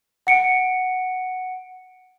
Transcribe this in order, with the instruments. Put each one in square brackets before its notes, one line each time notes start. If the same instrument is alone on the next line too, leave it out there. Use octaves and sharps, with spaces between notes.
[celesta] F#5 C#7 D7